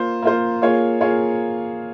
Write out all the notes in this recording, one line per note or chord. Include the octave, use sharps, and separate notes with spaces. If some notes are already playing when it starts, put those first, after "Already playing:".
Already playing: A#3 F4 C5
A#3 F4 C5
A#3 F4 G#4 C#5
A#3 F4 G#4 C#5